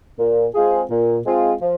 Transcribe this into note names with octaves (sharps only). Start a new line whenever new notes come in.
A#2
G#3 C4 F4 G#4
A#2
G#3 C4 F4 G#4
F3